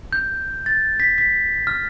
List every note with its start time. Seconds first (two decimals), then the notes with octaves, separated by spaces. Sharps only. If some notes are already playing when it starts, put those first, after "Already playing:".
0.13 G6
0.66 A6
1.00 B6
1.18 B6
1.67 F6